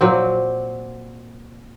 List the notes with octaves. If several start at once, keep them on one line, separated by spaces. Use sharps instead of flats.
A#2 F#3 C4